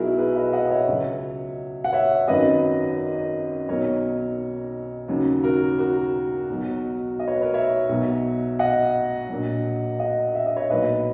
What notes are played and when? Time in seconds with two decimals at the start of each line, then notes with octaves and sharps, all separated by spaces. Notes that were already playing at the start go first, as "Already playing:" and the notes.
Already playing: B1 B2 F#3 E4 F#4 G#4 A#4
0.18 G#4 B4
0.35 B4 D#5
0.53 D#5 F#5
0.67 D#5
0.70 C#5 E5
0.88 C#2 C#3 F#3
1.84 F#5
1.93 C#5 E5
2.28 G#1 F#2 D#3 F#3 B4 D#5
3.69 B1 B2 F#3 A#4 C#5
5.08 D#2 C#3 F#3
5.44 F#4 A#4
5.78 F#4 A#4
6.49 B1 B2 F#3
7.19 D#5
7.28 C#5
7.35 B4
7.42 A#4 C#5
7.54 C#5 E5
7.89 B1 B2 F#3
8.59 D#5 F#5
9.29 A#1 A#2 F#3
9.99 D#5 F#5
10.35 E5
10.46 D#5
10.56 C#5 E5
10.70 B1 A#2 F#3 B4 D#5